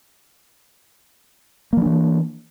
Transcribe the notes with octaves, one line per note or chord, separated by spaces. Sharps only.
E3 F3 A#3 D4